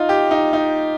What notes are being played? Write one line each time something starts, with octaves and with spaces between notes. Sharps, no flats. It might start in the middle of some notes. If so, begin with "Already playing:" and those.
Already playing: D#4 F4
G4
D#4
D#4